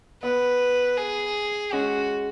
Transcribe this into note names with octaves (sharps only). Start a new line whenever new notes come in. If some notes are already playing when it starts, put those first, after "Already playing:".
B3 B4
G#4
G#3 C#4 F#4